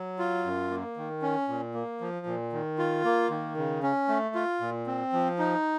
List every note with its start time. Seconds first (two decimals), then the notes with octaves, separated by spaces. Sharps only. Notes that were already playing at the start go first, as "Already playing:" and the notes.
Already playing: F#3
0.19 F4
0.44 F#2
0.70 A#3
0.97 D#3
1.22 C#4
1.48 A#2
1.74 A#3
2.01 F3
2.26 A#2
2.52 D#3
2.78 F4
3.04 A#3
3.30 D#3
3.57 C#3
3.83 C#4
4.08 A3
4.35 F4
4.61 A#2
4.86 C4
5.13 F3
5.39 D#4